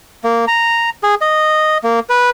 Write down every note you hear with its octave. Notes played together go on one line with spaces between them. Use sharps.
A#3
A#5
G#4
D#5
A#3
B4